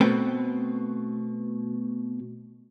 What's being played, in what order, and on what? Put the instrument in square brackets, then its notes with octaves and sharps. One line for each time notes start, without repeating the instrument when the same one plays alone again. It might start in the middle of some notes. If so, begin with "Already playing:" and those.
[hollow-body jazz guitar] B2 A3 C4 B4 G5